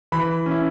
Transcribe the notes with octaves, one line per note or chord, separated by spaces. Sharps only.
E3 B5
C#4 E4